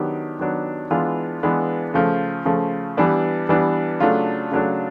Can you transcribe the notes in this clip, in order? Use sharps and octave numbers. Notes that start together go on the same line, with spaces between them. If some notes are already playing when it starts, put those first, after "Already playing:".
Already playing: D#3 F#3 B3 D4 G4
D#3 F#3 B3 D4
E3 G#3 B3 D4 F4
E3 G#3 B3 D4
C#3 F3 A3
C#3 F3 A3
E3 G3 B3 D4
E3 G3 B3 D4
C#3 F#3 A3 D4 F4
C#3 F#3 A3 D4